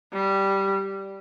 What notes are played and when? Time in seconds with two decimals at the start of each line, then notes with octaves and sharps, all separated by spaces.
0.13 G3